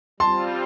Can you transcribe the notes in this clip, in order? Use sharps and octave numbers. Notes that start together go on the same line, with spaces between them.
G3 C4 F4 A5 C6